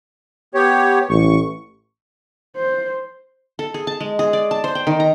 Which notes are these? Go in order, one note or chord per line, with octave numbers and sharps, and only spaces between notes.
B3 G4 C#5
A1 C#6
C5
A4
G#4
A5
G#3
G#4
D5
A5
C5
G5
D#3
A#5